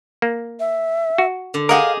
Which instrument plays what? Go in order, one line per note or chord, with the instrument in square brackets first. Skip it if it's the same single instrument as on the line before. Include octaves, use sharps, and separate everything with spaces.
[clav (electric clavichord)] A#3
[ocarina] E5
[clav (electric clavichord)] F#4
[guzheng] D3
[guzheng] G4 G#4 D#5 [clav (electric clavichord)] A#4 F#5 [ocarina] F5